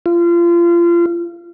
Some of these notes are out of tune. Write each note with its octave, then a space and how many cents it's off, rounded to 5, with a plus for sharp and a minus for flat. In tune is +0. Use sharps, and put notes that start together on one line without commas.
F4 -30